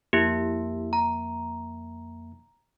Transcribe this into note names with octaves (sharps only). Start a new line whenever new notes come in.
F2 A#3 E4 G4 E5
A#5